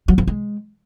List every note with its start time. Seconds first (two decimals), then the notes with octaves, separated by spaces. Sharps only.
0.08 F#3
0.18 F3
0.27 G#3